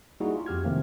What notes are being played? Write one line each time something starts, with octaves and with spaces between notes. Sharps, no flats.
G3 A#3 D#4 E4 F#4 G#4
F4
F2 G4 F6 G#6
C3 D#3 F3 A3 A#3 C4